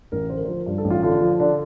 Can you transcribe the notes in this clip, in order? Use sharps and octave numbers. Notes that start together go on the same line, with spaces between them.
A1 A#4
D3 C5
A#4
F3 C5
G2
A4
A1
F4
D3 F4
F3
D3 D4